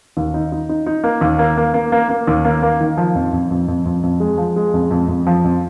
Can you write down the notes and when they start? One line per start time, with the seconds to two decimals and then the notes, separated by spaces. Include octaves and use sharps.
0.17 D#2
0.34 D#4
0.52 D#4
0.69 D#4
0.86 D#4
1.04 A#3
1.21 D#2
1.39 A#3
1.57 A#3
1.74 A#3
1.92 A#3
2.09 A#3
2.27 D#2
2.45 A#3
2.63 A#3
2.80 D#3
2.97 F3
3.15 F2
3.33 F2
3.51 F2
3.68 F2
3.85 F2
4.03 F2
4.20 G#3
4.38 F3
4.56 G#3
4.73 F2
4.91 F2
5.08 F2
5.27 F3
5.44 F2